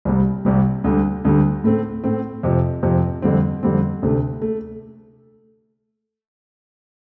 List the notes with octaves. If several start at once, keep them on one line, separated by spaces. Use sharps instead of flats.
C2 C3 G3
C2 C3 G3
D2 D3 G3
D2 D3 G3
A2 A3 C4
A2 A3 C4
F2 C3 F3
F2 C3 F3
F2 D3 G3 C4
F2 D3 G3 C4
D2 C3 A3
A3